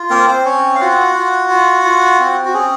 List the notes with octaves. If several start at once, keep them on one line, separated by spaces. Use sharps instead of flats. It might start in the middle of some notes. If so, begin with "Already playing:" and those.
Already playing: F4
A#3 C4 A#4
C4 C5
C4 C#4 C#5
F5
F4 F#4 F#5
F4
F4
F4
C4
F#4
C#4 G#4